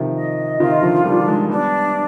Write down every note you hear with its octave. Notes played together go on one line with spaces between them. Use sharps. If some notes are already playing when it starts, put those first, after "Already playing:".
Already playing: C3 D#3 F3
D#5
C3 D#3 F4
D3 F3
D#3 G3 D4
F3 G#3
G3 B3 D4